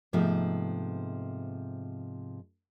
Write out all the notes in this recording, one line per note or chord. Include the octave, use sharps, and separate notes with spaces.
G#2 C3 F3 A3 B3 D#4